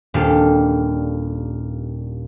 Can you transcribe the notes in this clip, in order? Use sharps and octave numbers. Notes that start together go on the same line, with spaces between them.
D#1 A#2 D4 G4 A4 F5